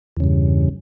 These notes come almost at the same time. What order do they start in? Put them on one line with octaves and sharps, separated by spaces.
E2 C#3 G2